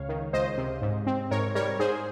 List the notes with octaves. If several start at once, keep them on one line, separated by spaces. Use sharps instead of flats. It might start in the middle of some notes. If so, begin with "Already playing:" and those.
Already playing: C#2 C#3 C#5 F5
D#3
C#2 C5 D#5
C3
G#2
C4
G#2 A#4 C#5
G3 A#4 C#5
G#2 G#4 C5